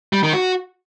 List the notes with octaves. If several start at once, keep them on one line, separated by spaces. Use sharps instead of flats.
G3
D#3
F#4